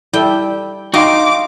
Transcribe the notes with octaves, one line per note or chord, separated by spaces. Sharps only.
G3 E4 A4 G5
D#4 F#4 F5 G5 C6 D6